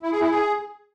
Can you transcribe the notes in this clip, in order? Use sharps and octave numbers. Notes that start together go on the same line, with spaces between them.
E4
G#4
E4
G#4